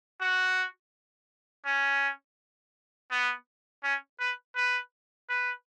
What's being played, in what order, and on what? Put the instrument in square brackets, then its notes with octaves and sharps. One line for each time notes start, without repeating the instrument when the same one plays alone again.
[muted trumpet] F#4
C#4
B3
C#4
B4
B4
B4